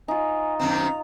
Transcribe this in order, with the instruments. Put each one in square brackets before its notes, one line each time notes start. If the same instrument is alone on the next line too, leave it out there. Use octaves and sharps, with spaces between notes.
[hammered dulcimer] D#4 F4 [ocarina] G#5
[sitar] F#2 D#3 C4 [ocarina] A#5